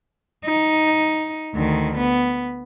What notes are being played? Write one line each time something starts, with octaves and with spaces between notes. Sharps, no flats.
D#4
D2 D#3
B3